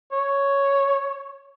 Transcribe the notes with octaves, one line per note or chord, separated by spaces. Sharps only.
C#5